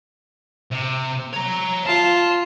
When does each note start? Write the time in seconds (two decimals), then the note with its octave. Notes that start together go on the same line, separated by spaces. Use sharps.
0.71 C3
1.33 C#5 A#5
1.86 F4 A5